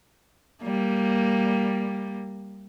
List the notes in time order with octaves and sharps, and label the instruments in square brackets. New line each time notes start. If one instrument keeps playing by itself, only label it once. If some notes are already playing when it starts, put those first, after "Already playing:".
[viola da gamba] G3 A#3